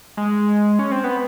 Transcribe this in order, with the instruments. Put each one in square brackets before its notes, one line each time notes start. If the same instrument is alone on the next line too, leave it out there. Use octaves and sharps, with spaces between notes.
[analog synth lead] G#3
C#4
C4
B3